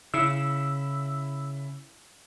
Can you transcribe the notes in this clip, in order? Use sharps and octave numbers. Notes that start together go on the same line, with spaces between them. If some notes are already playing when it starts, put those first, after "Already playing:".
C#3 E4 E6